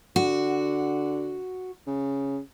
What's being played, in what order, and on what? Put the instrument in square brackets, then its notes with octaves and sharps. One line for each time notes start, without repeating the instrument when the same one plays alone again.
[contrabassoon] D3 [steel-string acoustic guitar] F#4
[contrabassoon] C#3